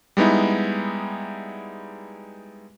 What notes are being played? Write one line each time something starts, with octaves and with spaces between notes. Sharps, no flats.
G3 G#3 B3 D#4 E4